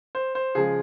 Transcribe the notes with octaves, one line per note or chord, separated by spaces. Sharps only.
C5
C5
C#3 F3 G#3 G#4